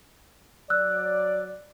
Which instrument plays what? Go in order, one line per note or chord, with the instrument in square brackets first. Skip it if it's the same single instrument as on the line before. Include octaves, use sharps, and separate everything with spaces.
[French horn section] F#3 D5 [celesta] E6 F#6